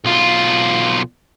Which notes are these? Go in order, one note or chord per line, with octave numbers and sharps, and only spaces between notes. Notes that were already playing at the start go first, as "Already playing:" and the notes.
B1 F4